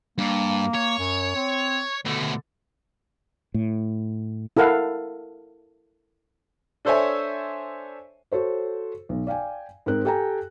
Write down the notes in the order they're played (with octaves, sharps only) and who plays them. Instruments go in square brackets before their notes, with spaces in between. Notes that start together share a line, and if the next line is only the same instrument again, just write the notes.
[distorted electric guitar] G2 [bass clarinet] A#3
[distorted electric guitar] C#5
[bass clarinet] F#2
C4
[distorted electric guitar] B2 A3 [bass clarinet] D3
[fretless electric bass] A2
[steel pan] E4 A4 A#4 F5 F#5
[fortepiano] D4 A4 C5 C#5 E5 G#5
[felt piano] F#4 A4 C5 C#5
B1
D5 F5 G5 G#5
G#2 C4 A#4 F#6
G4 A4 G5 G#5 A#5